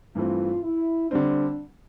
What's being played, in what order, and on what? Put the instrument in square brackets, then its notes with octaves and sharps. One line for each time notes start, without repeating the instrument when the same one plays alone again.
[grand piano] G2 E3 A3 C4 [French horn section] F4
[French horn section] E4
[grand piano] D3 G3 C4 [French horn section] D4